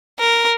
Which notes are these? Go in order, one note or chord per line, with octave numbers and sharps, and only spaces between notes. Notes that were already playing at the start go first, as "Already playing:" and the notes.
A#4